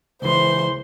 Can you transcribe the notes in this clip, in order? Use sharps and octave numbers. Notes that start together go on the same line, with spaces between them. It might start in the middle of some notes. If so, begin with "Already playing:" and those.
C#2 E3 C5 C6